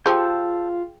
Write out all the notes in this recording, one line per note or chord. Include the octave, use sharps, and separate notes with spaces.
F3 F4 G4 G#4 G5 A5 E6 G6